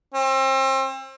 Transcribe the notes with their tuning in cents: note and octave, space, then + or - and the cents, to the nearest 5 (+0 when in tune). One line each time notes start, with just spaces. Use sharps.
C4 +35